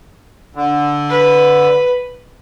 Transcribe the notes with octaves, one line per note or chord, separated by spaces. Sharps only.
D3
B4